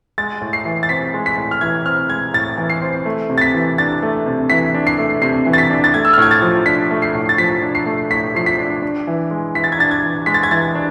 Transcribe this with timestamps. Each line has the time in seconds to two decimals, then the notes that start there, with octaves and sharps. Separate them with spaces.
0.18 G#3 A6
0.41 A2
0.53 C7
0.65 E3
0.83 A6
0.89 C4 B6
1.14 G#3
1.26 B6
1.37 A2
1.51 F6
1.61 E3 G#6
1.85 C4 F6
2.09 G#3 G#6
2.33 A2 A6
2.58 E3
2.70 C7
2.81 C4
3.05 A3
3.30 C3
3.38 A6
3.41 B6
3.54 E3
3.78 D4 A6
4.02 A3
4.26 C3
4.50 E3 B6
4.74 D4
4.87 C7
4.98 A3
5.22 C3 C7
5.46 E3
5.53 A6
5.58 B6
5.70 D4
5.84 A6
5.94 A3 G#6
6.05 E6
6.13 F6
6.18 A2 G#6
6.31 A6
6.42 F3
6.66 D4 B6
6.91 A3
7.02 C7
7.15 A2
7.29 A6
7.38 F3 B6
7.63 D4
7.75 C7
7.86 A3
8.11 A2 B6
8.35 F3 C7
8.46 B6
8.58 D4
8.82 D4
9.07 E3
9.31 G#3
9.55 E3 B6
9.64 A6
9.72 G#6
9.79 D4 A6
9.91 G#6
10.03 E3
10.26 G#3 B6
10.34 A6
10.43 G#6
10.51 E3 A6
10.75 D4